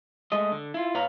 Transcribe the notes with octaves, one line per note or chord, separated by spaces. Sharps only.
G#3 A3 D#5
D3
E4 F4
A#2 B4 C#5 F5 A#5